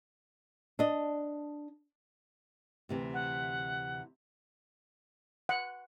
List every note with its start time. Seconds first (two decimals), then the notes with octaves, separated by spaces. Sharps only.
0.79 D4 D#5
2.89 D2 C3 E3
3.14 F#5
5.49 F#5